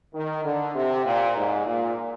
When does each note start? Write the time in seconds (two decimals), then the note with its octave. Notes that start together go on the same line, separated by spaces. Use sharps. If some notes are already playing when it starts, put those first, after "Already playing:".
0.14 D#3
0.44 D3
0.74 C3
1.05 A#2
1.36 G#2
1.66 A#2